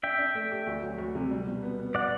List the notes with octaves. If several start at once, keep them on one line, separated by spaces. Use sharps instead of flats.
D4 E5 G5
D4
A3
G4
D2
F#3
D2
C3
G3
B2
B3
B3
D5 F#5